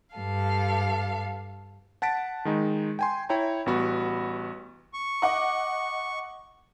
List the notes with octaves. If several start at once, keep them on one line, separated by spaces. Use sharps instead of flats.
G2 A4 F5
F#5 A5 A6 B6 D7
D#3 G#3 D#4
G5 G#5 C6
E4 C#5 G5 A#5
A1 G3 B3 F#4 B5
C#6
D#5 F#5 D6